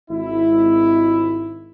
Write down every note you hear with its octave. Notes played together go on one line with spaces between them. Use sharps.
G#1 E4